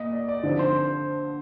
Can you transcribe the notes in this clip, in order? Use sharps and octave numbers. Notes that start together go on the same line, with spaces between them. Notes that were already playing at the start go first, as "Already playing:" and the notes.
Already playing: A#2 D#5
D5
D5
D3 F3 C4 D#4
C5